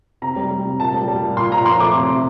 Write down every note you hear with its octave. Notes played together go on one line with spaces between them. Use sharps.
C3 A#5
G3
G3
C3
A#2 A5
G3
G3
A#2
A#2 C6
A#2 A#5
F3 C6
A3 D6
C3
C3